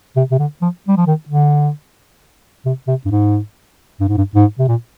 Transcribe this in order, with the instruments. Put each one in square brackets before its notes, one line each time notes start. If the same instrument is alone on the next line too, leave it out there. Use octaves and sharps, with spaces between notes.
[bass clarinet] C3
C3
D3
F3
G3
F3
D#3
D3
C3
C3
G2
G#2
G2
G#2
G2
G#2
C3
A#2